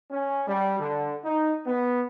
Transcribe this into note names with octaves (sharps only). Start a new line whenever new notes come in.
C#4
G3
D3
D#4
B3